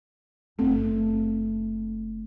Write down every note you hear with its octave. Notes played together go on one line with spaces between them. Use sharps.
F#1 A3 C4